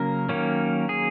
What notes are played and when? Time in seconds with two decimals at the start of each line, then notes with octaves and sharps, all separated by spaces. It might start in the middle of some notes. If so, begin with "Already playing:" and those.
Already playing: C#3 F#3 A#3 C#4 A#4
0.29 D#3 F#3 A#3 C#4
0.89 G#4